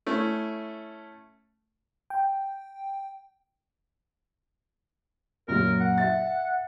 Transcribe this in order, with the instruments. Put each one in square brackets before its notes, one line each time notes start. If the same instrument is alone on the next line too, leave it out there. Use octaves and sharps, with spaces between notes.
[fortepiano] A3 C#4 E4
[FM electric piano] G5
[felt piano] F#2 A#2 F#3 [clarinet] A#4
[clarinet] F#5
[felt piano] E5 A6